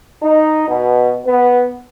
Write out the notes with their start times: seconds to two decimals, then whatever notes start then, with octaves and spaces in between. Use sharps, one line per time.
0.22 D#4
0.68 B2
1.25 B3